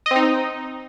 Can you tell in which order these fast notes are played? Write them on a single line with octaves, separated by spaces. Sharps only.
D#5 C4 D#4